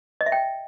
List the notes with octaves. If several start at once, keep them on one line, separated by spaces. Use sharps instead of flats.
D#5
E5
G5